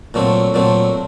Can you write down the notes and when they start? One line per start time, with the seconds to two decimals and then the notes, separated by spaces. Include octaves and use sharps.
0.14 A#2 F#3 A3 C4
0.54 A#2 F#3 A3 C4